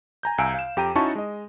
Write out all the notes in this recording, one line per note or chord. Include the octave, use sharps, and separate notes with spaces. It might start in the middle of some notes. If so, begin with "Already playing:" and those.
G#5 A#5 G6
C2 F5 G#5 A#5 E6 D7
F5 E7
F2 G4 G5 A#5 D#7
C#4 D#4 E4 F#4 A5 C#6
G#3 D#5